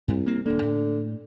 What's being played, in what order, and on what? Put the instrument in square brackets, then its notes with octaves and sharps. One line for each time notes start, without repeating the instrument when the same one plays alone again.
[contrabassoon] C2 [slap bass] G2
[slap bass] A#3 C4
[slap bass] D#1 A#3 [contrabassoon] D3
[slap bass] A2